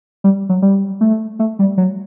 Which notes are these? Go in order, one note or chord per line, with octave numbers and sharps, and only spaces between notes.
G3
F#3
G3
A3
A3
G3
F#3